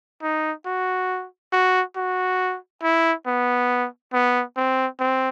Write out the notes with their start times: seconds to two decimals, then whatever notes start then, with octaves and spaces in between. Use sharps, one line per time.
0.22 D#4
0.66 F#4
1.52 F#4
1.96 F#4
2.83 E4
3.26 B3
4.13 B3
4.57 C4
5.00 C4